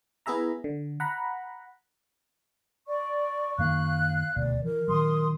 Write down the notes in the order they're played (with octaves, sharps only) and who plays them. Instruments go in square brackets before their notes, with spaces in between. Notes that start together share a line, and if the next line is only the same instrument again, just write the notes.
[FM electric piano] B3 E4 G#4 E5 A#5
D3
F#5 A#5 B5
[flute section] D5 [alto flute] C#6
[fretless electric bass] F#2 D#3 A#3 [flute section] F5 F#6
[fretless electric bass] D#1 D2 B2 [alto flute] D5
[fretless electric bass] E3 [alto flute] A#4
[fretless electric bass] A#2 D#3 F#3 [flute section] C6 D#6